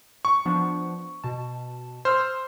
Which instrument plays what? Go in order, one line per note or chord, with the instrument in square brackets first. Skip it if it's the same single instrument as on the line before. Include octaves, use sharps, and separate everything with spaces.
[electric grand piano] C#6
[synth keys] F3 B3 D4
B2 A5
[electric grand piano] C5 [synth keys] E6 F6